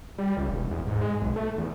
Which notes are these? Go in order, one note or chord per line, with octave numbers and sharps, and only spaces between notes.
G3
C#2
E1
E2
G#2
G#3
B1
A3
E2